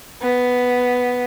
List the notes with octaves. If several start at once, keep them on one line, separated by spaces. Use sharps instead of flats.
B3